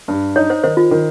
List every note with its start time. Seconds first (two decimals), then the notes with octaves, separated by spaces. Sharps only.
0.08 G2
0.36 D#4 C#5
0.50 C5
0.64 D#3 C5
0.77 F4
0.91 D#3